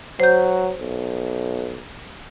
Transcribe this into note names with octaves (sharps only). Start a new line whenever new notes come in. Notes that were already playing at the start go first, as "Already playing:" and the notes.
F#3 C5 G6
B1